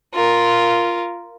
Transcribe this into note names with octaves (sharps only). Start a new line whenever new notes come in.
F4 A#4